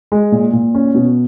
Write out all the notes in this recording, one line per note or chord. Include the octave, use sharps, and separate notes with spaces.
G#3
A#2
A#2
C#4
B2